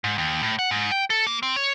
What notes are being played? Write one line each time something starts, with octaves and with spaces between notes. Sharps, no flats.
G#2
D#2
A2
F#5
G#2
G5
A4
A#3
C4
C#5